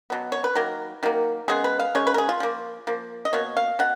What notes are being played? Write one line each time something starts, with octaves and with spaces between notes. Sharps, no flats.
B2 F#3 B3
C#5
B4
D#3 F#3 A#3 A#4
D#3 F#3 A#3
C#3 G#3 B3 G#4
B4
F5
C#3 G#3 C#5
B4
A#4
G#4
F4
F3 A#3
F3 A#3
D#5
B2 A#3 C#5
F5
B2 F#5